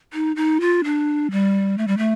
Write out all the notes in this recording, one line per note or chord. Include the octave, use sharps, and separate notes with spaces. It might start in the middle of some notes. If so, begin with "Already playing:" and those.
D#4
D#4
F4
D4
G3
A3
G3
A3